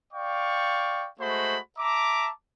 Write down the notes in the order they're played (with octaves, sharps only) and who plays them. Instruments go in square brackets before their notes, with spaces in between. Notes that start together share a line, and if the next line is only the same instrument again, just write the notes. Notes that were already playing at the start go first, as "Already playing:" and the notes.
[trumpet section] D5 F5 G5 C#6
G#3 A3 F#4 C5 B5
E5 A5 A#5 D6